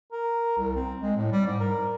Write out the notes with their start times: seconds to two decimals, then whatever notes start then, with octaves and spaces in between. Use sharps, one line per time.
0.12 A#4
0.57 C2
0.76 C4
1.01 G#3
1.16 A2
1.32 G3
1.47 G#2
1.60 A#4